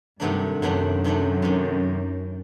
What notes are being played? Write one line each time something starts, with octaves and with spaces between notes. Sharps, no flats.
G2 C3 D#3 F#3 A3 D4
F#2 C3 D#3 F#3 A3 D4
C3 D#3 F#3 A3 D4
C3 D#3